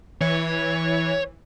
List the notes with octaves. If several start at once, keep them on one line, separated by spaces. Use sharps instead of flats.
E3 C#5